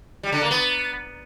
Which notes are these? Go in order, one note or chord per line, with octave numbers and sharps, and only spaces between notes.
G3
D3
A#3
B3